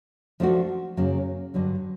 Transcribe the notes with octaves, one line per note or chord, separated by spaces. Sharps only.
F3 A3 D4 F#4
F#2 C#3 F#3 A#3 C#4
G2 D3 F#3